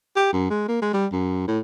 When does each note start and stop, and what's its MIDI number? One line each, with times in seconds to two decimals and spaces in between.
0.16 0.31 67
0.33 0.49 42
0.50 0.67 56
0.68 0.78 58
0.82 0.89 56
0.94 1.07 55
1.13 1.44 42
1.47 1.59 45